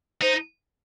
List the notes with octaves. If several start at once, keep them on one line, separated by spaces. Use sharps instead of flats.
D#4 C5